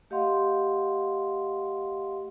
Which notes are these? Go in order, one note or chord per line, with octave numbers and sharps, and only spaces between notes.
A3 G4 D#5 F5 F#5 C6